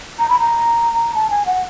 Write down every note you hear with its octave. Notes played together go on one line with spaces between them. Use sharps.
A#5
B5
A#5
A5
G#5
F#5